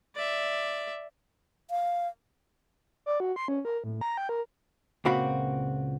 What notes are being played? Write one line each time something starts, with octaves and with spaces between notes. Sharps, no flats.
D5 E5
F5
D5
F#4
C6
C#4
A#4
A2
A#5
G5
A#4
C#2 A#2 A#3 C4 F#4 B5